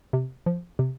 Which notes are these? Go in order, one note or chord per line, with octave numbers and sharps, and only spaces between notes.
C3
F3
C3